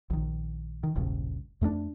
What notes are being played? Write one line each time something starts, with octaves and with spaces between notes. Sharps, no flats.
A#1 D#3
D#3
E1 A#1 G2 C#3
F2 A3 A#3 D4